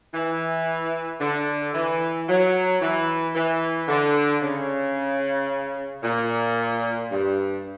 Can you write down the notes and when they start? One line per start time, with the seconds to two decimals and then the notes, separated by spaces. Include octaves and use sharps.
0.14 E3
1.21 D3
1.74 E3
2.29 F#3
2.81 E3
3.35 E3
3.88 D3
4.42 C#3
6.03 A#2
7.10 G2